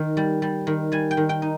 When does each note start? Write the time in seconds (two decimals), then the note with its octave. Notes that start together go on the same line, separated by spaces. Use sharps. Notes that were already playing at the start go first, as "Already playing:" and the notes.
Already playing: D#3
0.17 G3
0.42 G3
0.67 D#3
0.92 G3 G#5
1.11 G5
1.17 D#3
1.29 G5
1.42 D#4